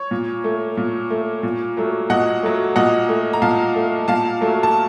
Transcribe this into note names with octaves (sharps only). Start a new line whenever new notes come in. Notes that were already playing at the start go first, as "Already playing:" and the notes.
Already playing: C#5
A#2
A3
A#2
A3
A#2
F#3 A3
A#2 D#5 F#5
F#3 A3
A#2 D#5 F#5
A3
A#5
A#2 F5 A5
A3
A#2 F5 A5
F#3 A3
A5